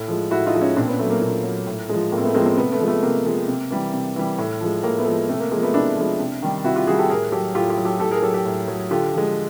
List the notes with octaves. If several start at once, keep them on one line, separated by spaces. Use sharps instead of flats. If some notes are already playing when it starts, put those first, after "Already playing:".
Already playing: A2
F3 G#3
A2 E4 F#4
D#4 F4
F3 G#3
C#4 D#4
A#2 C4 D4
B3 C#4
F#3 A3
A#3
A#2
F#3
A2
F3 G#3
A2 A#3
C4
A3 B3
F3 G#3 A#3 C4
A#3 C4
C3 A3 B3
A3 B3
F3 G#3
A3 B3
C3 A#3
F3 G#3
C3
E3 G3
C3
E3 G3
A2
F3 G#3
A2 A#3
A3 B3
F3 G#3
C3 A3
A#3
F3 G#3 A#3
A3 B3
C3 D4 E4
F3 G#3
C3
D#3 G3
C3 E4 F#4
F4 G4
D#3 G3 F#4 G#4
G4 A4
A2 G#4 A#4
F#3 G4 A4
A2 F4 G4
F4 G4
F#3
G4 A4
A2 G4 A4
G#4 A#4
F#3 G4 A4
G4 A4
A2
F#3
D3 F4 G4
F3 G#3